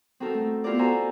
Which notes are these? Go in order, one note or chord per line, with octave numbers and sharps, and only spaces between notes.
C4 D#4 F#4 A4 A#4
A3
B3 E4 F4 G4 A#4 D5
F#4 A4 C5 G#5 A#5 C6